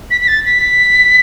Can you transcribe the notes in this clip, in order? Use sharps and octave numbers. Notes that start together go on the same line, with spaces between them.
B6
B6
A6
B6